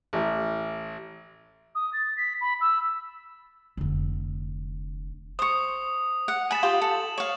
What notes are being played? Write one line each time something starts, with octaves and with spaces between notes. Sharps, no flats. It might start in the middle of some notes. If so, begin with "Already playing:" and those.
A1
D#6
A6
B6
B5
E6
F1 D3
C5 C#6 D#6
F#5
G#5 B5 A6 E7 F#7
F4 G4 G5
A4
C#5 F5